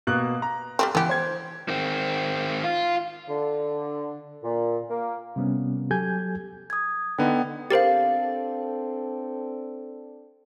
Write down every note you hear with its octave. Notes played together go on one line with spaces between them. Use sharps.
B2 A#3 F#6
A#5
G3 A3 C4
E3 B3 G4
C5 G#6
D#3 C4
F4
D3
A#2
A#3
C3 G3 B3 C#4
F#3 G4 A4 G#5 G6 G#6
D#6 G#6
D3 B3 D#4 G5
C4 D4 G4 A4 A#4 C5 F5 A6